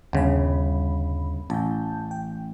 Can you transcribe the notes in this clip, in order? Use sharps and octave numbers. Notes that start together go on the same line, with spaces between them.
G1 D#2 C#3 B5
A1 A5 G6
G5